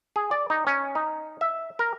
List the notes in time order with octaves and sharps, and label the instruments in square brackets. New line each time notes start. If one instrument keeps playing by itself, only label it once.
[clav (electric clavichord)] G#4
D5
D#4
C#4
D#4
E5
A#4